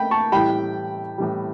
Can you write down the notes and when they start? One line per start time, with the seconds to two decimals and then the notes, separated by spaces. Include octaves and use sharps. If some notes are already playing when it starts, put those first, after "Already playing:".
Already playing: A3 G5 B5
0.11 A5 C#6
0.32 A2 E3 G3 G5 B5
1.18 A2 E3 G3